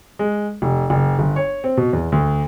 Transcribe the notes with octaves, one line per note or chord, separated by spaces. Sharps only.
G#3
F1
F#1
G1
C#5
C4
B2
E2
D2